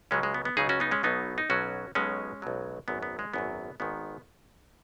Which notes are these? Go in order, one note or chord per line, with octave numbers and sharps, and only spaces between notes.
C#2 C#3 F#3 G#3 C#4
G#3
B3
B3
C#2 C#3 F#3 D#4 G#4
C#4 F#4
B3 D#4
G#3 C#4
B1 B2 F#3 B3 D#4
D#4
B1 B2 F#3 C#4 F#4
B1 B2 F#3 G#3 C#4
B1 B2 F#3
G#1 F#2 F#3 B3
B3
G#3
G#1 F#2 F#3 B3
G#1 G#2 D#3 B3